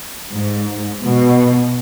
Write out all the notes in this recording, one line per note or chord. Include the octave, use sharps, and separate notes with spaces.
G#2
B2